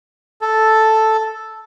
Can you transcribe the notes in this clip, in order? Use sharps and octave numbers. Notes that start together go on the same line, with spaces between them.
A4